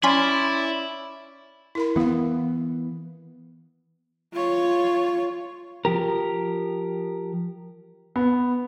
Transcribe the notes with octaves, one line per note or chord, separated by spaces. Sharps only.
C#4 E4 D5 G#5 B5 C6
E4 A#4 B5
E3 B3 E4 F5
F4 C#5
F3 G4 A#4
B3